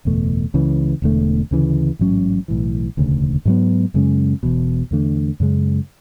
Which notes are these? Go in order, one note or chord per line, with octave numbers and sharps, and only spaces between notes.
F#1 E2 B2 A3
C#2 C#3 E3
E1 E2 D3 A3
D2 C#3 E3
A1 G#2 F#3 C#4
B1 A2 E3
E1 D2 C#3
G#2 F#3 B3
F#2 C#3 G#3 C#4
E1 E2 B2
E2 D3 A3 D4
F#2 C#3 G#3